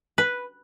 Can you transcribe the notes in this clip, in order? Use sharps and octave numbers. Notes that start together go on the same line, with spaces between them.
B4